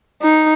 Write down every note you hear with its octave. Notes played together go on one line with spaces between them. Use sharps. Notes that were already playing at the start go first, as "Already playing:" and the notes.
D#4